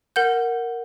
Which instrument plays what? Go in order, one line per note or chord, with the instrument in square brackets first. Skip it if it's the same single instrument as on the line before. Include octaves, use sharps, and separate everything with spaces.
[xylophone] A#4 F#5 G6